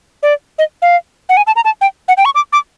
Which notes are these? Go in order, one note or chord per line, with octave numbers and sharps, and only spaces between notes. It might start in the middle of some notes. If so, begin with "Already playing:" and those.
D5
D#5
F5
F#5
G#5
A5
A#5
A5
G5
F#5
G5
C#6
D6
D6